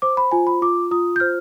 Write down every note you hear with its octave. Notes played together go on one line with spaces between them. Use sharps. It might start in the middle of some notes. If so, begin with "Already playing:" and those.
C5 D6
B5
F4 G#5
B5
F4 D6
F4 D#6
G6
C5 F6